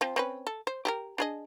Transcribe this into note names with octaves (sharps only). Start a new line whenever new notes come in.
F3 C4
C4 C#4 B4
A4
C5
G4 G#4 A#4
D4 G#4 D#5